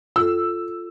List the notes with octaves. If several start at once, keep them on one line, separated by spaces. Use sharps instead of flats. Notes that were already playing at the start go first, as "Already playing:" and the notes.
F4 A4 E6